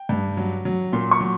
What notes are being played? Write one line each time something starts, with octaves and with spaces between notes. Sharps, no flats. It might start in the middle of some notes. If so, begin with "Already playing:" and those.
Already playing: G5
G2
F#3
F#3
A#2 C6
C#6
F#3